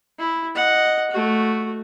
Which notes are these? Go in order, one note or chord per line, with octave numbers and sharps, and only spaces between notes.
E4
D#5 F#5
A3 F#4